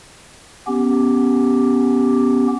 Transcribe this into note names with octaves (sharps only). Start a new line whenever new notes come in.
B3 C#4 G4